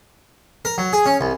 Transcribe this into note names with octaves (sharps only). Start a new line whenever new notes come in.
A#4
F#3
G#4
C#4
C2